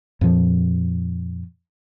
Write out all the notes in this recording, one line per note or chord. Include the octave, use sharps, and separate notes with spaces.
F2 A#2 F3